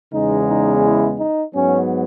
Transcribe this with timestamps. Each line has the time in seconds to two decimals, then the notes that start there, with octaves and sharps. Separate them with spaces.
0.13 E2 C#3 G#3 B3 D#4
0.47 D#4
0.83 E4
1.18 D#4
1.53 G#2 F#3 B3 C#4